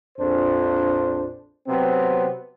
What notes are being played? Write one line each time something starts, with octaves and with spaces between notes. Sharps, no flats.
A#1 F2 D4 C5
C3 F#3 B3 C4